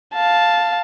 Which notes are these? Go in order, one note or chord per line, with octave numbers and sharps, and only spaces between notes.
F5 A5